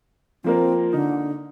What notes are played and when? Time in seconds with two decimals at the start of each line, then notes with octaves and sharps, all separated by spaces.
0.44 F3 A#3 C4 A#4
0.93 D3 D#4